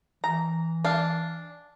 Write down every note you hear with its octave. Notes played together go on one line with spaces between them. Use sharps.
E3 A#5
D4 F5